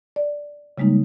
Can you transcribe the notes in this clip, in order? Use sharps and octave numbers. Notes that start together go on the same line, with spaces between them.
D5
C#3 G3 G#3 A#3 D#4